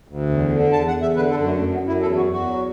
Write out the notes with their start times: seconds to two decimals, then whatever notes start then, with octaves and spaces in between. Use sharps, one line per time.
0.08 D2
0.29 E2
0.51 D3
0.73 E2 A5
0.88 F#5
0.95 E2
1.02 E5
1.16 D3 B4
1.30 A4
1.38 F#2
1.44 A3
1.59 F#2 A3
1.74 B3
1.80 F#2
1.88 E4
2.02 E2 A4
2.17 F#4
2.24 E2
2.31 F#4
2.46 F#3